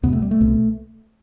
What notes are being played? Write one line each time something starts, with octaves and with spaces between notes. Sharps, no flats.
E2 C3 B3
A3
G3
A3
C2 B2